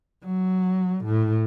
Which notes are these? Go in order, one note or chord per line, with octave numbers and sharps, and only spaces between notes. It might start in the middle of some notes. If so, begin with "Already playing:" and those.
F#3
A2